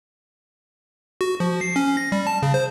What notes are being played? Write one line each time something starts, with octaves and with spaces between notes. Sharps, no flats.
F#4
F3
C7
C#4
A#6
G3
A5
C#3
C5